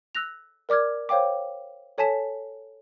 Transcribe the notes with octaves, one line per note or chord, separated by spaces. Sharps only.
E6 F#6 A#6 F7
A#4 D5 D6 F6 G#6
C5 C#5 F5 G5 D6
A4 C#5 G#5 A5 B6 E7